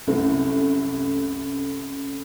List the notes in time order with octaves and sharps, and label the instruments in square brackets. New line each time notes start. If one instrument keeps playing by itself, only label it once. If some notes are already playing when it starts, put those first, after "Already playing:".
[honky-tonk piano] C2 F#2 A3